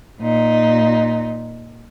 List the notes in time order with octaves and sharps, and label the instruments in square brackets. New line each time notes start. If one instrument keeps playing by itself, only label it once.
[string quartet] A#2 D#4